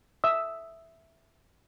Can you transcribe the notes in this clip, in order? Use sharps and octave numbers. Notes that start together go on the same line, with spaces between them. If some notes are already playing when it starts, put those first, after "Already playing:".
E5 D#6 E6